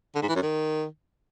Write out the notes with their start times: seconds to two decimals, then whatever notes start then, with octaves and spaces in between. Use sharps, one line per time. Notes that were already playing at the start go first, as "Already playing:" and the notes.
0.15 D3
0.22 G#2
0.29 E3
0.35 F#2
0.42 D#3